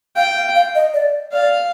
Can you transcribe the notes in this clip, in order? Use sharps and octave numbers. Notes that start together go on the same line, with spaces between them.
F5 G5
F5
F5
D#5
D5
D5 F5